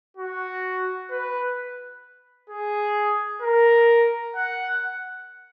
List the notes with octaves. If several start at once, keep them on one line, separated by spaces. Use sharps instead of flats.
F#4
B4
G#4
A#4
F#5